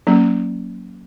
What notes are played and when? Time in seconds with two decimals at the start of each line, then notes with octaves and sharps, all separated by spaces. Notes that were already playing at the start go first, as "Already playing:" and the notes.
0.07 F#3 A#3 C#4